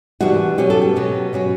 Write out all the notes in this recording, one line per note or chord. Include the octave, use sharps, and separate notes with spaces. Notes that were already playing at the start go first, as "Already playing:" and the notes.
E2 B2 G3 B3 D4 F#4
B2 F#3 C#4 G4
A4
G4
B2 F#3 C#4
B2 F#3 C#4